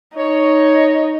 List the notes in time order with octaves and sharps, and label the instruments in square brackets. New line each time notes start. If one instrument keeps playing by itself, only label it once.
[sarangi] D#4 [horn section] C#5